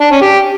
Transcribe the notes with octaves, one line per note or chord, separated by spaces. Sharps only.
D4
C#4
G4